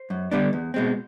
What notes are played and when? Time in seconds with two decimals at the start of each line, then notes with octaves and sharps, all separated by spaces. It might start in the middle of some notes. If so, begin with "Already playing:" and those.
Already playing: C5
0.10 F#2
0.31 D3 G3 B3 D4
0.53 E2
0.74 B2 G#3 C4